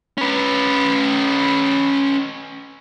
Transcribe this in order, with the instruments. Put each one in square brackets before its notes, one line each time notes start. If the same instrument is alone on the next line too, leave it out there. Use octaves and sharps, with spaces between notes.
[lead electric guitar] C#4 B4